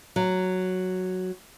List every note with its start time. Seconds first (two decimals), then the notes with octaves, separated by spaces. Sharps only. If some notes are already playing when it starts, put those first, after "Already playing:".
0.16 F#3